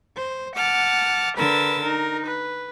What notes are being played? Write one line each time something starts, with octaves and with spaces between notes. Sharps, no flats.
C5
F#5 A5 D6 F6
D3 A#4 B4 E6 A6
D#4 A#4
B4